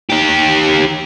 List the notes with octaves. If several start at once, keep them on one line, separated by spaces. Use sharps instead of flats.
D#3 G4